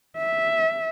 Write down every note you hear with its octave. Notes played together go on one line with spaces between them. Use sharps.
E5